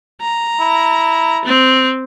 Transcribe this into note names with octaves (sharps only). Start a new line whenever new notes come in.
A#5
E4
C4